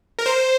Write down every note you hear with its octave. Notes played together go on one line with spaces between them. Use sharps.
A#4
C5